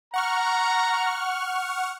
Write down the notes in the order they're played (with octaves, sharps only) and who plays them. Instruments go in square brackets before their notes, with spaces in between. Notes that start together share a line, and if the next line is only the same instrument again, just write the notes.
[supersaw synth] F#5 C#6 F6 [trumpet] A#5